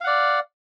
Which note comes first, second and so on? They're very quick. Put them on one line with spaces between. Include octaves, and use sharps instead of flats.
F5 F#5 D5